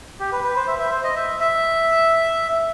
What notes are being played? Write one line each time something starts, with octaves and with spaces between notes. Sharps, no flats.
G4
B4
B4
C5
E5
E5
C5
D#5
E5
E5